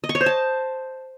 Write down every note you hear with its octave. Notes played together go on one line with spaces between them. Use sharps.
D#5
C#6
C#5
C5
A5